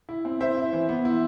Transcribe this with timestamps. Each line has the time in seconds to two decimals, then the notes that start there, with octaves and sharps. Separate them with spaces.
0.09 E4
0.25 C4
0.41 E4 C5 E5
0.57 E4
0.73 E3
0.89 B3
1.05 E4